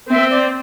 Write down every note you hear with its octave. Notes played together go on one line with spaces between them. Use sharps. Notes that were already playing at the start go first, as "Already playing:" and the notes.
C4 E5
D5